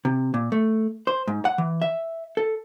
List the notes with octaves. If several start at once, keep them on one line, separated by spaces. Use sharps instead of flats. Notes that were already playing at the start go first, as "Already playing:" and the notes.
C3
A#2
A3
C5
G#2
F#5
E3
E5
A4